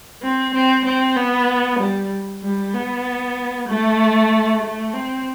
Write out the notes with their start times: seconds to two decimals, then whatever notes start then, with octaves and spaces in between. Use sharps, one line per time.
0.23 C4
0.54 C4
0.85 C4
1.17 B3
1.79 G3
2.43 G3
2.74 B3
3.68 A3
4.62 A3
4.93 C4